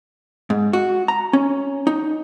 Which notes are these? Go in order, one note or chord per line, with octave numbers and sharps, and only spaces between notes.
G#2
F#4
A#5
C#4
D#4